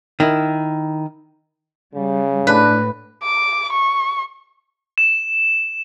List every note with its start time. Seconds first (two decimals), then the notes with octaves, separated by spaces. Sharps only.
0.20 D#3 E4
1.95 C#3 G3
2.47 A2 D4 B4
3.23 D6
3.72 C#6
4.98 E7